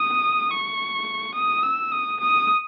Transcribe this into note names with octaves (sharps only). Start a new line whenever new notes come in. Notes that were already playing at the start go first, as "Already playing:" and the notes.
Already playing: D#6
C#6
D#6
E6
D#6
D#6